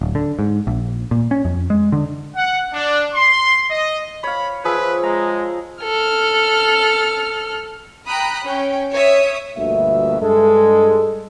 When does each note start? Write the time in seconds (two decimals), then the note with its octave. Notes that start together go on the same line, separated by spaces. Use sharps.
0.01 D1
0.15 D3
0.39 G#2
0.67 A#1
1.11 A#2
1.31 C#4
1.45 F2
1.70 G#3
1.92 D3
2.36 F#5
2.73 D4
3.15 C6
3.70 D#5
4.24 C#5 F5 B5
4.64 F3 G#4 B4 E5
5.03 G#3 A#5
5.83 A4 F6
8.07 G5 A#5 B5 D#6 F#6
8.44 C#4 G5
8.92 C#5 E5 D#6
9.57 G1 D2 G2 B2 A#3 E5
10.21 G2 G#3 A4